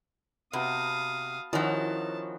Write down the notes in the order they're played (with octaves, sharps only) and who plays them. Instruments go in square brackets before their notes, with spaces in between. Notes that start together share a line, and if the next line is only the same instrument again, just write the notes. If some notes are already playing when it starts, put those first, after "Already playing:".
[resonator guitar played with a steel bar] C3 [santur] B3 F#4 A5 [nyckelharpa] F5 D#6
[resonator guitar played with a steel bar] D#3 F3 [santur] C#4 F#4 E5 [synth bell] E4 [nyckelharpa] A5